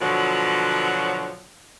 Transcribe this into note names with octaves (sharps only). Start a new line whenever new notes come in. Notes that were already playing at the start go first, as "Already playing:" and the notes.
B2 D3 F3 F#3